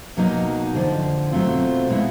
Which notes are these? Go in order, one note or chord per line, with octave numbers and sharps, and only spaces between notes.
B2 F#3 A#3 D#4
F2 D3 F3
B2 F#3 A3 C4 F4
B2 G#3 B3 E4